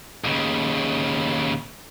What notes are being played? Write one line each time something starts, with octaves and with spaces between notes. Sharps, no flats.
D#2 C#3